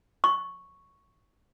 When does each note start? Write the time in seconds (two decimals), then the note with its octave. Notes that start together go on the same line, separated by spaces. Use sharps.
0.24 C#6